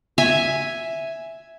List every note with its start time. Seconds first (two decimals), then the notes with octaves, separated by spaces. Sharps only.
0.18 E5 G#5